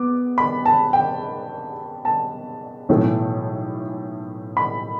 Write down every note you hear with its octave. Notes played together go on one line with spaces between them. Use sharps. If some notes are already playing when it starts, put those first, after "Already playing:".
Already playing: B3 D6
B5
A5
G5
A5
B1 A2 E3 A3
B5